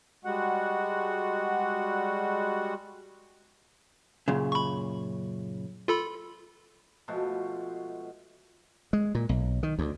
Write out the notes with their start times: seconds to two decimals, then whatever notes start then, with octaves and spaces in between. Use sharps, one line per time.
0.25 G3 G#3 F#4 F#5
4.28 F#2 A#2 C#3
4.52 B5 C#6
5.88 F4 A4 B5
7.08 B2 F3 G#3 A3
8.93 G#3
9.15 A#2
9.29 B1
9.63 D#3
9.79 D2